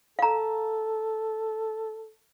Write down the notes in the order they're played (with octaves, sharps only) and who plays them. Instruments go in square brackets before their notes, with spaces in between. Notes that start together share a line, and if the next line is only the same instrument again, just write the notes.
[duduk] A4 [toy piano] F5 A#5